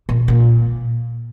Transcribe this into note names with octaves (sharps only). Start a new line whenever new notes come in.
A#2
A#2